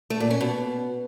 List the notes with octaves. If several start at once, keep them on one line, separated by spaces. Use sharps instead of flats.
A3
A#2
C#4
B2